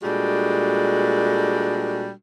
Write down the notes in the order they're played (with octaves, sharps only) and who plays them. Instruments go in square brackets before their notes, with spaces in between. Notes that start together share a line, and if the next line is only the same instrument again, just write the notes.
[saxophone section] A#2 G3 G#3 D4 F#4 A4